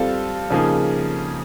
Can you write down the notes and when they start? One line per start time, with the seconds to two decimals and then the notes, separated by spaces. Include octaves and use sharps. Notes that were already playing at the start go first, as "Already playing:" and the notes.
Already playing: G3 C4 F4 A4
0.51 C#3 F3 A#3 D#4 G#4